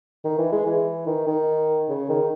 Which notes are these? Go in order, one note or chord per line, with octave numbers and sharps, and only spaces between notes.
D#3
E3
G#3
E3
D#3
D#3
C#3
D#3